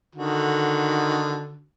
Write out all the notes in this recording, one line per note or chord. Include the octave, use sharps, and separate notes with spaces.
D3 D#3 F#4